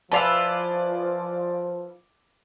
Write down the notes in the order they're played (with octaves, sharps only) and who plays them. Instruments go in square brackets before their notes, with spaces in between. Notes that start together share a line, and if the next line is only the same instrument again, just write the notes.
[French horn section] F3 [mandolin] E4 F4 B4 [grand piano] D5 G#5 A5